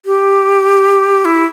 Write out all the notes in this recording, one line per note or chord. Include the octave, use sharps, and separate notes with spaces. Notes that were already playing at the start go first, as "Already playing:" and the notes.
G4
E4